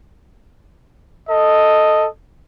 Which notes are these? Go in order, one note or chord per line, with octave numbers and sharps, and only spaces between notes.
A4 D#5